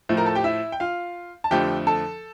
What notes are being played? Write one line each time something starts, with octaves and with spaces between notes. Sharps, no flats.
A2 F3 A3
A#4 A#5
A4 A5
G4 G5
E4 E5
G5
F4 F5
A5
F2 D3 F3 A3 G4 G5
A4 A5